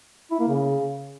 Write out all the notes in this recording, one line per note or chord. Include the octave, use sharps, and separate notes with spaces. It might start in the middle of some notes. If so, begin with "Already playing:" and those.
E4
A#3
C#3